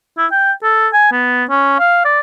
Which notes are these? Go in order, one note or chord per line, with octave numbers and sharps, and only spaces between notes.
E4
G5
A4
G#5
B3
C#4
F5
D5